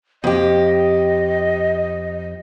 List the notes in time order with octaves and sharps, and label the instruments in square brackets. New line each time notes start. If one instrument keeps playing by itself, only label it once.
[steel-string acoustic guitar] F2 G4 [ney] D#5